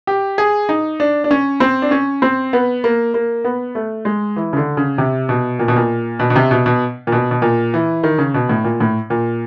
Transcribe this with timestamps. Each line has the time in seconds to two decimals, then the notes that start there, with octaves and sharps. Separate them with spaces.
0.07 G4
0.38 G#4
0.69 D#4
1.00 D4
1.24 D4
1.31 C#4
1.60 C4
1.82 D4
1.91 C#4
2.22 C4
2.53 B3
2.84 A#3
3.14 A#3
3.44 B3
3.75 A3
4.05 G#3
4.36 E3
4.53 C#3
4.57 D3
4.77 C#3
4.98 C3
5.29 B2
5.59 A#2
5.68 B2
5.76 A#2
6.19 B2
6.30 B2
6.36 C3
6.51 B2
6.66 B2
7.07 A#2
7.12 B2
7.31 B2
7.42 A#2
7.74 E3
8.03 D#3
8.18 C#3
8.34 B2
8.49 A2
8.64 A#2
8.80 A2
9.10 A#2